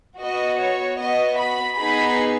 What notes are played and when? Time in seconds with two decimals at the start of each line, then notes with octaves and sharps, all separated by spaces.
0.20 B3 F#4 D#5
0.60 C#5
0.99 B3 D#5
1.05 F#4
1.39 B5
1.78 B3 D#4 G#4 B5